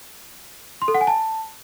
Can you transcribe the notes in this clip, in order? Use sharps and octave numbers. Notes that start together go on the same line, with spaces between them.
C6
A4
F#5
G#5
A5